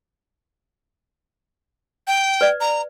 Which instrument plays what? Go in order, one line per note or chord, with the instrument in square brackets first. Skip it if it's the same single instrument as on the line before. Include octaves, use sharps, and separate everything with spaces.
[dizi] G5
[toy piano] B4 D5
[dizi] A#5